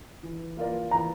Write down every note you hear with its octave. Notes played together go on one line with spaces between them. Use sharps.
E3
A#3 F4 A#4 D5
E3 A#5